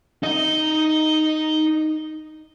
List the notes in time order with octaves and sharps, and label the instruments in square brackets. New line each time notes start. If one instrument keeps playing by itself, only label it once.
[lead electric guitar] D#4 D#5